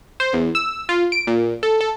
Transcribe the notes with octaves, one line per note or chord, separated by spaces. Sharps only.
C5
E2
E6
F4
D7
A#2
A4
A4